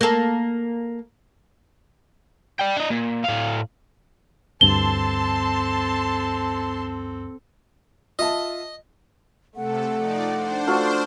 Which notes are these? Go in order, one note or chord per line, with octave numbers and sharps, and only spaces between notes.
A#3 A4
D5 G5
D4 D#5
A#2
A2 F5
D2 G2 C4 A4 A5 C6 G7
F4 D#5 E5 A5
C3 A3 A4 F#5
F3 D#4 D5
D4 C5
A3 F4 F#4